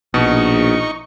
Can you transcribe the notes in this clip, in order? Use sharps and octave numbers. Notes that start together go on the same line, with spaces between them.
A#1 B2 D#4 C#6